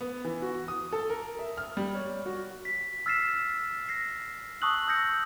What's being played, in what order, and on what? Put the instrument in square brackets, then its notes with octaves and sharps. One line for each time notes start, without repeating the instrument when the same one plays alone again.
[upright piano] B3
E3
F#4
D#6
A4
A#4
E5
F6
G3
C#5
F#4
[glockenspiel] B6
E6 F6 A6 B6 C7 E7
A#6 C7
A5 C#6 D#6 E6 F#6 F#7
D#6 E6 G6 A#6 C#7